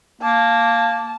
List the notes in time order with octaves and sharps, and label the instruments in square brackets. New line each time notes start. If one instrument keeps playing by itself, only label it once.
[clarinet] A#3 [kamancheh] A5